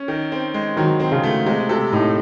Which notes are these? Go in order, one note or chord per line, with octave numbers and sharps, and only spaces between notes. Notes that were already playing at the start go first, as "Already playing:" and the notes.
Already playing: C#4
D#3
C4
G#3
D#3 F#3
C4
C#3
A3
C3 G#3
C3 A4
A2 D#4